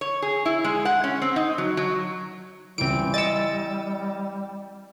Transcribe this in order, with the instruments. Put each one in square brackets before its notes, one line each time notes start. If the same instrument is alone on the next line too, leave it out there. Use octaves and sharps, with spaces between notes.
[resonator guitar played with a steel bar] C#5
G#4
E4
G#3
F#5
C#4
C4
D#4
F#3
F#3
[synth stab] C#2 D7 [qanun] E3 C4 [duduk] G3
[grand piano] D#5 C#7 [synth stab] E6 A6